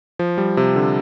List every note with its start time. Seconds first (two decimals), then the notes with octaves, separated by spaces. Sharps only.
0.19 F3
0.38 G3
0.57 C3
0.76 D3